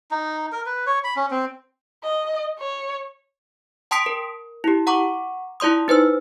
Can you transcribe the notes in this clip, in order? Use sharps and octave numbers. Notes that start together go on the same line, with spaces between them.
D#4
A#4
B4
C#5
B5
C#4
C4
D#5
C#5
G5 A5 C6 D#6 B6 D7
A#4
E4 G4
F#5 A#5 C#6 D6
E4 F4 D5 C6 D#6
D#4 B4 C5 E6